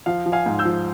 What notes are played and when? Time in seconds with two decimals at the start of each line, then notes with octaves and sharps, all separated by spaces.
0.06 F3 F5
0.26 F3
0.32 F5 G#5
0.46 G#2
0.59 E6 G6
0.65 F3